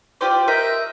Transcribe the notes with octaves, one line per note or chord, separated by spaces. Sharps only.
F4 G4 C5 D5
A#4 D#5 E5 G6